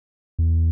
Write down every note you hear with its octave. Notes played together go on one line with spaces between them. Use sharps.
E2